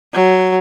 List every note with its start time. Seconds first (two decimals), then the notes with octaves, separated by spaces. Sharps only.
0.14 F#3